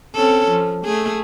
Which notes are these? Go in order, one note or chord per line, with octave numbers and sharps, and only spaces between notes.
C4 C#4 A4
F3
A3 G#4